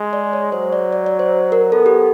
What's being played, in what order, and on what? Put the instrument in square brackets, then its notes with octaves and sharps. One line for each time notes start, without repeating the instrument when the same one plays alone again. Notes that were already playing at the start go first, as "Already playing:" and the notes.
Already playing: [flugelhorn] G#3
[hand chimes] D5
C#5
[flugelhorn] F#3 [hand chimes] C5
[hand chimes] D5
D5
D5
C5
A#4
[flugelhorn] B3 [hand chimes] A4
[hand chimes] G4